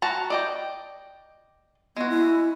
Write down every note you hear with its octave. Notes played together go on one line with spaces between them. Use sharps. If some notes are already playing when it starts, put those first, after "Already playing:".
F#4 A5 A#5
D5 D#5 G5
G#3 B3 F#4
E4